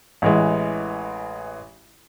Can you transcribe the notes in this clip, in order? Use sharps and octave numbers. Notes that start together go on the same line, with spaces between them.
A1 E3 G#3